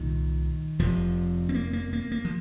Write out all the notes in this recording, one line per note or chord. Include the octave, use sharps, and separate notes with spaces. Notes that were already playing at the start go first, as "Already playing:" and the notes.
Already playing: C2 A#2 D#3
F1 F2 C3 F3
C4
A#3
A#3
A#3
A#3
F3